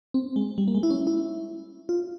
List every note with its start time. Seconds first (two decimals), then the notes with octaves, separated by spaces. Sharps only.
0.14 C4
0.36 G#3
0.58 G3
0.68 A#3
0.75 G#3
0.83 E4
0.90 C#4
1.07 E4
1.89 F4